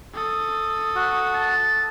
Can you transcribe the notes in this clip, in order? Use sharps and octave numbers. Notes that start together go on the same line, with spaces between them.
A4 D#6
F#4
A5